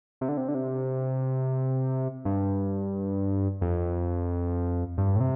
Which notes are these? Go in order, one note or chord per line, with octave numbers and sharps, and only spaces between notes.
C3
D3
C3
D3
C3
G2
F2
G2
A2
C3